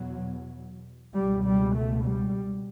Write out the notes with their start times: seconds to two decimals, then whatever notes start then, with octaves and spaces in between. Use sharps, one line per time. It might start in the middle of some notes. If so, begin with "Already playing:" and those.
Already playing: E2 B2 F#3
1.13 C#2 B2 G3
1.44 G3
1.75 A3
2.05 G3